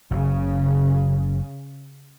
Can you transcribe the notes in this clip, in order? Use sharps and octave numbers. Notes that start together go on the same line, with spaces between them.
F#1 C#3